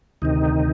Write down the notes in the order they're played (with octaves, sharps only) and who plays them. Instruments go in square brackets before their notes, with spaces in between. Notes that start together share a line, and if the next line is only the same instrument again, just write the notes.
[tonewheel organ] D2 C3 D#3 D#4